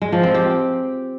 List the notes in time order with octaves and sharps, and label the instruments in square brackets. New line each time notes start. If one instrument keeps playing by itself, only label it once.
[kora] G#3
F3
C4
G4